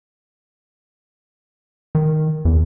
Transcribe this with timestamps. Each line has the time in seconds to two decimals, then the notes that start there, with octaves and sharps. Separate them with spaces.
1.95 D#3
2.45 E2